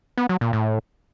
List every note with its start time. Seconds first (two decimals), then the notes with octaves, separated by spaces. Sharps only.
0.18 B3
0.29 F#3
0.41 A#2
0.53 A2